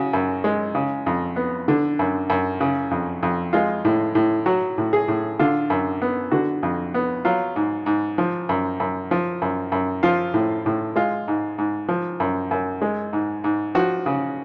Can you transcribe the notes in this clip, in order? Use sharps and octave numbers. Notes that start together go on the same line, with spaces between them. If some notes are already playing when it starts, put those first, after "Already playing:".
Already playing: C#3 F#4
F#2
G#3
C#3
F2
B3
D3
F#2
F#2
C#3
F2
F2
G#3 F4
A2
A2
F#3 F#4
A2
G#4
A2
D3 F4
F#2
B3
D3 F#4
F2
B3
F#3 F4
G#2
G#2
F3
F#2
F#2
F3
F#2
F#2
F3 F4
A2
A2
G#3 F4
G#2
G#2
F3
F#2
F#2
G#3
G#2
G#2
F3 F#4
C#3